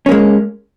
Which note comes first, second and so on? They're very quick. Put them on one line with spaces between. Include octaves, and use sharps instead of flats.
C#4 A#3 G#3